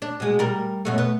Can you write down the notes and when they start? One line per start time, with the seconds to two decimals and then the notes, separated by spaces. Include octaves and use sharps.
0.02 D4
0.20 B2 G#3
0.39 G3 A#4
0.85 F#2 B2 A3
0.98 B3